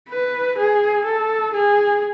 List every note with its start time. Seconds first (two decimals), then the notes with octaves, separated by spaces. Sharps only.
0.09 B4
0.58 G#4
1.05 A4
1.54 G#4